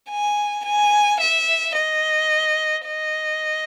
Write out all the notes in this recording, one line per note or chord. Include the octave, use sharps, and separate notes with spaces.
G#5
G#5
E5
D#5
D#5